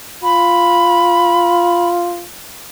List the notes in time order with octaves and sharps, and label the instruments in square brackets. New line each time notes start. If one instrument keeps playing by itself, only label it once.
[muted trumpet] F4 [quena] B5